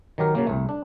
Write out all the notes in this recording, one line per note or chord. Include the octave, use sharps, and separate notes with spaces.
D#3 F#3 G4 A#4
C#3 F#3 A#3
C2 A3
D4